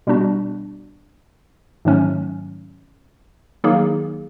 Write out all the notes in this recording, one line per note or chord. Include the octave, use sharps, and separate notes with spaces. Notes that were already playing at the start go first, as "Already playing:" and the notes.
B2 G3 B3 D4 F#4
G#2 D#3 F#3 A3 C#4
D#3 F#3 A#3 D#4 G#4